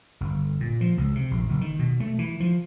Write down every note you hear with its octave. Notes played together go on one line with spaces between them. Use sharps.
G1
A#2
F3
C#2
C3
A#1
F#1
D#3
B2
A3
E3
F3